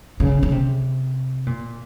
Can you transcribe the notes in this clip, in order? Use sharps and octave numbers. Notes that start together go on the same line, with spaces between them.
C#3
C#3
C3
A#2